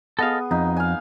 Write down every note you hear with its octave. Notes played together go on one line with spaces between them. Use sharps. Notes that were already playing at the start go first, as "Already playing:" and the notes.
B3 G#4 A4 D#5 F5
F2 D#4
F5 G#5